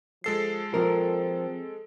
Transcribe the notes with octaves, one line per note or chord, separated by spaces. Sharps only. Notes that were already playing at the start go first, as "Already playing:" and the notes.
F3 G#3 A4 C7
F3 C4 A#4